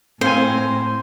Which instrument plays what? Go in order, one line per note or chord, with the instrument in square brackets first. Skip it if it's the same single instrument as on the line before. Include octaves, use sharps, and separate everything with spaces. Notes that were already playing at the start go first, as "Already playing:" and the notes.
[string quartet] A2 [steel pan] C4 F5 G#5 [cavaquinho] C5